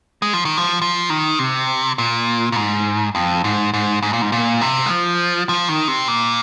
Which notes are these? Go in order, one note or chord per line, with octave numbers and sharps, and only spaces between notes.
G#3
F3
D#3
F3
F3
D#3
C3
A#2
A#2
G#2
F2
G#2
G#2
G#2
A#2
G#2
A#2
C3
G#3
F3
F3
D#3
C3
A#2